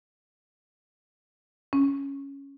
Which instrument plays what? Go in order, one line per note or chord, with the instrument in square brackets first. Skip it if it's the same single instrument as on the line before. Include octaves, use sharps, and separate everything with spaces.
[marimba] C#4